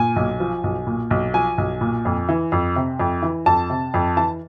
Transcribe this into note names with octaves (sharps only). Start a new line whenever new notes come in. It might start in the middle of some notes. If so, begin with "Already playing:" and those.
Already playing: A#2 G#5
B1
F3
B1
A#2
B1
F3 G#5
B1
A#2
F2
E3
F2
C3
F2
E3
F2 A5
C3
F2
E3 A5